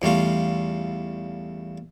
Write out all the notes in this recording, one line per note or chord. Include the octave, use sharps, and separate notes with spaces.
E2 G3 A3 F4